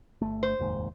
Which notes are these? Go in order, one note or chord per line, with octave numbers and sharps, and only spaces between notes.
G1 A3
C5
F1 D#2 G#2